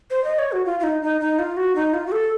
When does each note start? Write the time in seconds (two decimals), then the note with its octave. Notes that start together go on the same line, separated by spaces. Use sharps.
0.11 C5
0.24 D#5
0.39 C#5
0.52 F#4
0.66 F4
0.80 F4
0.83 D#4
1.02 D#4
1.21 D#4
1.39 F4
1.57 F#4
1.75 D#4
1.94 F4
2.07 F#4
2.12 A4